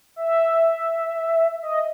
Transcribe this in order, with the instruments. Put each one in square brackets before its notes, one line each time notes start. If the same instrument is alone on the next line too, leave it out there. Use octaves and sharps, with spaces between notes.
[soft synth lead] E5
D#5